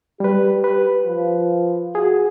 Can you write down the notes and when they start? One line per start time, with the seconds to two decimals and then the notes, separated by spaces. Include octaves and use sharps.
0.20 G3 G4 B4
0.64 B4
1.05 F3
1.95 F#4 G#4